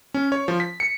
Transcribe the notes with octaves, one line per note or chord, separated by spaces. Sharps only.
C#4
C#5
F3
B6
C#7